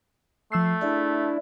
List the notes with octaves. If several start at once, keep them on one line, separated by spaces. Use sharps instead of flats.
F3 A3 E6 C7
D4 E4 G#4